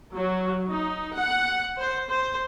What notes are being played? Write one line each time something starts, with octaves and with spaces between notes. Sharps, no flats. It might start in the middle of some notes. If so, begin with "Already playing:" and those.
F#3
D#4
F#5
C5
C5